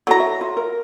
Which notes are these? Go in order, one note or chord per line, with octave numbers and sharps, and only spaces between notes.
F#3 E4 F#4 A4 A#5
E5
F4
A#4